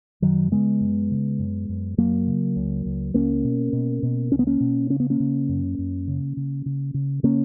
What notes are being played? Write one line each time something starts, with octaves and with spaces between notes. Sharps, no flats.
F#2 D#3 F#3
C#3 G#3 B3
F#2
C#3
F#2
F#2
F#2 F#3 A#3
C#3
C#2
C#2
C#2 A#3 C#4
B2
B2
B2
C#2 C#4
B3
A#3 C#4
B2
C#3 C#4
B3
A#3 C#4
C#3
F#2
F#2
C#3
C#3
C#3
C#3
C#3 A#3 C#4